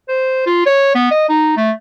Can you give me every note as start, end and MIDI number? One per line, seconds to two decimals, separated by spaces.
0.08 0.45 72
0.46 0.63 65
0.66 0.95 73
0.95 1.10 59
1.11 1.28 75
1.29 1.54 63
1.57 1.71 57